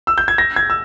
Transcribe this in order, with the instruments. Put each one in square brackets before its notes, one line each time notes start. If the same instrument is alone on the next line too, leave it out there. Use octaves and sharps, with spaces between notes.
[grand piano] E6
G6
G#6
A#6
G#6
E6